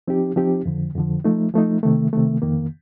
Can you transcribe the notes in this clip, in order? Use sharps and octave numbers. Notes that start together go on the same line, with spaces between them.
F3 C4 D#4 G4
F3 C4 D#4 G4
F2 D3 F3
F2 D3 F3
F3 A3 D#4
F3 A3 D#4
C3 D#3 A3
C3 D#3 A3
F2 D#3 A#3